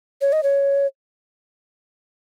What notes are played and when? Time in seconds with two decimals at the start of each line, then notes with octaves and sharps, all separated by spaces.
0.21 C#5
0.33 D#5
0.43 C#5